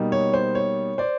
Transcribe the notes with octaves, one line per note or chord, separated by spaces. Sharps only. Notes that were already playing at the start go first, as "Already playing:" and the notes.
Already playing: B2 G3 A#3 D#4
C#5
C5
C#5
C5 D5